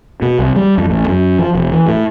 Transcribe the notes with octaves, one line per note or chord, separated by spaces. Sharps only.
B2
C2
G3
F2
A1
F#2
F3
E1
E3
A2